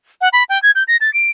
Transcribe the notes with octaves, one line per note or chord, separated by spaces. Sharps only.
F#5
B5
G5
G#6
G6
A#6
A6
D7